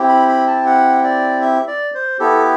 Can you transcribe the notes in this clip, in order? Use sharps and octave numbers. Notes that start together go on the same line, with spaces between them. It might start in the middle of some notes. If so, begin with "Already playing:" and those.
Already playing: C4 E4 G4
B5
B5
A5
F#5
D5
E5
D5
C5
B3 E4 G4 A4